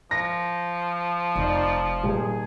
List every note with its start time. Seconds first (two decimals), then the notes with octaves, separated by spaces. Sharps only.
0.11 F3 A#6
1.36 F1 D#4 D5
2.03 D#1 G#4